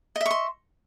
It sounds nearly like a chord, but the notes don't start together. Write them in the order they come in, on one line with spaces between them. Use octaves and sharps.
D#5 E5 C#6 C6